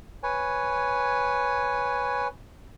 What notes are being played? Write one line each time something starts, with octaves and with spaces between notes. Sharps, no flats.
B4 C#5 G#5